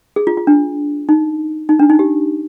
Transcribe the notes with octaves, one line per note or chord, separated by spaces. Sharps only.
G#4
F4
F4
D4
D#4
D#4
D4
D#4
G4